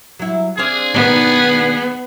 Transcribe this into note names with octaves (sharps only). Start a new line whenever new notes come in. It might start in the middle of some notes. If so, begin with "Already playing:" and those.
F#3 E4
C4 D4 G#4 F5
B2 D#3 B3 D4